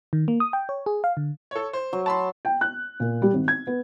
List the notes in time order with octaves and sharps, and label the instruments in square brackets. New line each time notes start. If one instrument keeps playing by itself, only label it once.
[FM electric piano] D#3
A#3
D#6
G5
C#5
G#4
F5
D3
[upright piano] A4 C#5
C5
[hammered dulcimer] F#3
[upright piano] A5 B5 C6
[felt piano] G5
F#6
A#2
G3
G#1
G#6
B3